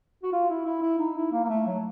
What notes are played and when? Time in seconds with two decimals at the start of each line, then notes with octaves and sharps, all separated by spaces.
0.23 F#4
0.33 F4
0.50 E4
0.65 E4
0.82 E4
0.99 D#4
1.16 E4
1.32 A#3
1.44 A#3
1.49 A3
1.67 F#3